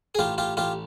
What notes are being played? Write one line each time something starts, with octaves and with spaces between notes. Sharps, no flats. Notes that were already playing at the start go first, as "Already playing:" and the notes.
G#4
A1 F4 G4
F4 G4
A1 F4 G4